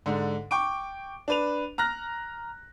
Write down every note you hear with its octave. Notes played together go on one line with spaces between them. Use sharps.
G#2 D3
G5 C#6 D6 D7
D4 B4 F7
A#5 F6 F#6 A#6